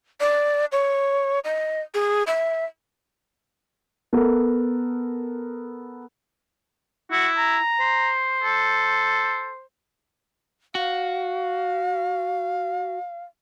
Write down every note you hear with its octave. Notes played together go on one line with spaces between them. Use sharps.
D5
C#5
D#5
G#4
E5
B3 A4 A#4
E4 F#4
A#5
C5
A4
F#4 F5